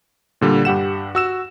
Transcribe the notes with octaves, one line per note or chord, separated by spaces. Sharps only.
A#2 D3 G3
G2 G4 F#5 E7
F#4 E6 E7